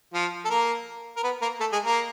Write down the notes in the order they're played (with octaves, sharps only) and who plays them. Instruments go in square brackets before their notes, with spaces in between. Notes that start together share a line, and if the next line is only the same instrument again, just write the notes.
[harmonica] F3 F4
A4
A#3 A#4
A#4
B3 B4
A#3 A#4
A3 A4
G#3 G#4
A#3 A#4